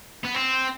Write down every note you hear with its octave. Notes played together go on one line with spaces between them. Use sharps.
B3
C4